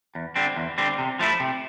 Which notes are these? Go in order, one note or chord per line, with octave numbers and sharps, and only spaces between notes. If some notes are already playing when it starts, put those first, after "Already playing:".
E2
D3 G3 C4
E2
D3 G3 C4
C3
F3 A3 E4
C3